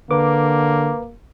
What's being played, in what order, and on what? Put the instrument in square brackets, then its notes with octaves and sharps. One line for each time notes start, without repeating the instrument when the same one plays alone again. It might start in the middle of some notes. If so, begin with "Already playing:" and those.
[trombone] D3 [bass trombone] A#3 [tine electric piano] B4 D6